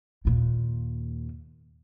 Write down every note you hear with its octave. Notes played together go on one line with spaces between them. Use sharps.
D#2 A#2